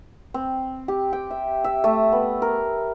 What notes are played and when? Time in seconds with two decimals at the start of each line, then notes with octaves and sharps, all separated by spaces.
0.34 C4
0.88 G4
1.13 G5
1.31 E5
1.64 E5
1.84 A3
2.12 B3
2.42 A#4